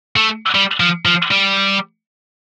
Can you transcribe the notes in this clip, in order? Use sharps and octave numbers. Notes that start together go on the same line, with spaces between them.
A3
G3
F3
F3
G3